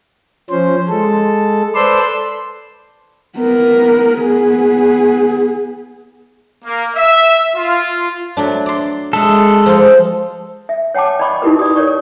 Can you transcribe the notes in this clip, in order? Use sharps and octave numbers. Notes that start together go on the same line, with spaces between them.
F3 C#4 C5
G#3 A4
A4 B4 C5 D5 C6 E6
B3 A#4
B3 G#4
A#3
E5
F4
F#3 A3 D4
D5 C6
G#3 A4 E5
F3 F4 C5
E5
C#5 F#5 G5 A5 D6
D5 D#5 G5 B5 C#6 D6
D#4 E4 F#4 G4 A#4 B4
D5 D#6
A#4 C#5 D5 C#6